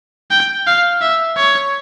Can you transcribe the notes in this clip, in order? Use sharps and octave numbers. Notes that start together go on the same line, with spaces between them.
G5
F5
E5
C#5